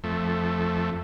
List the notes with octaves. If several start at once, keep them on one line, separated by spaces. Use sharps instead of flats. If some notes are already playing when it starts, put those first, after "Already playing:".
F2 A3